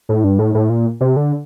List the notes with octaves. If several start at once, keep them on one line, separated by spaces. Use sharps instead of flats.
A2
G2
A2
A2
A#2
C3
D3